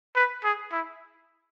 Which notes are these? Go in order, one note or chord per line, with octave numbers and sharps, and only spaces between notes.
B4
G#4
E4